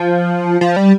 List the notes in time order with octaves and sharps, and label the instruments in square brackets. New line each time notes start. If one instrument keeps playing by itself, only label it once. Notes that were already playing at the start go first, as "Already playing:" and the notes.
Already playing: [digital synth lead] F3
F3
G3